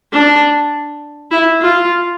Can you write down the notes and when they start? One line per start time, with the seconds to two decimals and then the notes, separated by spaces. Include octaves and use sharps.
0.12 D4
1.31 E4
1.61 F4